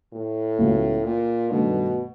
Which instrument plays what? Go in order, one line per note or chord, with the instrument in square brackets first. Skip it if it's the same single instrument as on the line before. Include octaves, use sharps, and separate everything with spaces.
[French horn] A2
[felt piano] C#2 C#3 F#3 B3
[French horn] A#2
[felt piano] G2 D#3 F#3 A3 D4 [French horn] B2